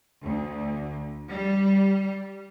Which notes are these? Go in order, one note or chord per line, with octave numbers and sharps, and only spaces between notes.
D2
G3